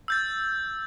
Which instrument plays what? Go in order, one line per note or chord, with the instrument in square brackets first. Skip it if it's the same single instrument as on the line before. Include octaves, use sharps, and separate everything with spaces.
[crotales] E6 G6 A6